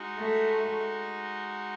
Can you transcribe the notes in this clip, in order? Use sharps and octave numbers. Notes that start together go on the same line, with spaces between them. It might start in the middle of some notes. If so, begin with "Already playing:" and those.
Already playing: G#3 D#4 F#4
A3